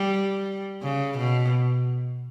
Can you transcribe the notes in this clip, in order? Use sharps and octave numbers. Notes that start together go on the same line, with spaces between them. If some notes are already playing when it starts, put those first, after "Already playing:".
Already playing: G3
C#3
B2